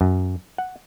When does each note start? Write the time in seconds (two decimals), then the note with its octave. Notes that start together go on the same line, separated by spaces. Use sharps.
0.01 F#2
0.58 F#5